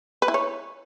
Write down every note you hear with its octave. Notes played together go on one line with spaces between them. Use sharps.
B4
E4
C#5